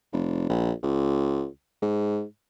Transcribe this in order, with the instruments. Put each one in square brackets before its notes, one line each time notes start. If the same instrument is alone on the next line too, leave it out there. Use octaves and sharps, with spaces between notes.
[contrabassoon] F1
A#1
C#2
G#2